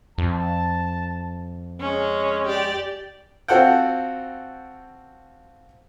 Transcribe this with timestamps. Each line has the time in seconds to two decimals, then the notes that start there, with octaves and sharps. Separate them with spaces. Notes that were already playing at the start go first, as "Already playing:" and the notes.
0.18 F2 A5
1.80 G#3 C#4
2.47 G4 D5
3.48 C4 F4 F#4 A4 F#5 G5